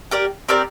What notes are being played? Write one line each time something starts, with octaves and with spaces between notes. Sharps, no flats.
G4 A#4 D5
C4 G4 A#4 D5